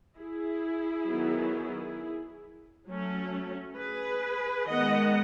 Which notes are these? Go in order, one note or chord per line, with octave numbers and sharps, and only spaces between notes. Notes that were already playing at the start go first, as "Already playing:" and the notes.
E4 G#4
D#3 F#3 B3
F#3 A3 C#4
G#4 B4
D#3 G#3 B3 D#5 F#5